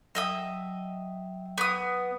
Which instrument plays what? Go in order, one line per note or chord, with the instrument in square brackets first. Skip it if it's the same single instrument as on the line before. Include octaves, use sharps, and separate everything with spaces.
[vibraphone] F#3 G5 [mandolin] D#5 E5 D#6
[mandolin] B3 D#6